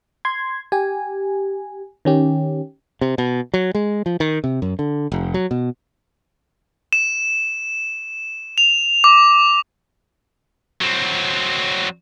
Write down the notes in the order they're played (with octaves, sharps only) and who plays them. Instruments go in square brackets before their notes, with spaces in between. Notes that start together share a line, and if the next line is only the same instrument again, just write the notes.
[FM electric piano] C6 G#6
G4 G#5
D#3 C#4 G4
[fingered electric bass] C3
B2
F#3
G#3
F3
D#3
C3
F#2
D3
F1
F#3
B2
[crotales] E7
F7
D6
[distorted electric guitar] F#3 C4